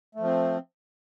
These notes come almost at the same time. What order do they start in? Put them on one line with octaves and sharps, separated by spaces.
A3 F3 C4